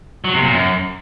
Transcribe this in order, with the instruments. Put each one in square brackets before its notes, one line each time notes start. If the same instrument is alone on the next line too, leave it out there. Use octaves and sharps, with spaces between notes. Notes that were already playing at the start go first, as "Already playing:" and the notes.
[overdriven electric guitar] F#3
C3
A#2
F#2